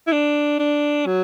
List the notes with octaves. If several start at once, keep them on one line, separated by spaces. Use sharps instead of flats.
E4
D4
D4
F#3